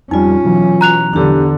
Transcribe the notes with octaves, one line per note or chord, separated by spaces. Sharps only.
F2 G3 C#4 D#4 F4 G#5
B2 E3 F#3
A#5 F#6 F7
E2 D3 D4 G4